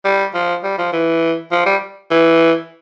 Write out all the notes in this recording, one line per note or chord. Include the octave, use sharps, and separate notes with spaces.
G3
F3
G3
F3
E3
F3
G3
E3